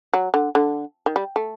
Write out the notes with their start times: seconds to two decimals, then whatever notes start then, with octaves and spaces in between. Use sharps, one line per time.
0.14 F#3
0.34 D3
0.55 D3
1.06 D#3
1.16 G3
1.36 A3